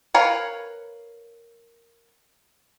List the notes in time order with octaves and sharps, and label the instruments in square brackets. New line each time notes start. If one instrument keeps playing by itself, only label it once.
[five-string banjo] A#4 B4 C#5 F5